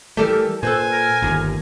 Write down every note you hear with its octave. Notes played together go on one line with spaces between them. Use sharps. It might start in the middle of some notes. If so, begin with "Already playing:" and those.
E3 G3 A3 G4 A4 A#4
A#2 A4 B4 C5 G#5
A#4
G1 D#2